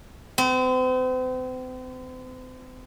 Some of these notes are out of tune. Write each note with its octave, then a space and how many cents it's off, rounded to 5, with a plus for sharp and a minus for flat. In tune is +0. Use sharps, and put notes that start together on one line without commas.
C4 -40